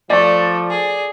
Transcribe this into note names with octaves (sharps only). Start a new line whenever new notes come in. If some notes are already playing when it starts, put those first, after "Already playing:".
F3 A3 D5
G#4